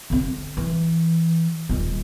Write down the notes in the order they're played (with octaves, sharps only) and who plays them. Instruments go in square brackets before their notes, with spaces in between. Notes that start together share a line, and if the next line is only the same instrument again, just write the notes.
[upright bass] D3 C4
E3
D#1 G#3